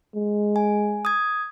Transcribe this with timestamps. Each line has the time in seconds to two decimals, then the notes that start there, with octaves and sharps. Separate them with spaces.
0.15 G#3
0.56 G#5
1.05 D#6 G#6